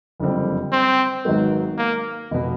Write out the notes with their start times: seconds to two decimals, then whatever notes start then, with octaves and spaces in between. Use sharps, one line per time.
0.20 F#1 F2 D3 G3 C4
0.73 C4
1.25 G#1 G#2 D#3 F#3 B3
1.78 A#3
2.31 F1 B2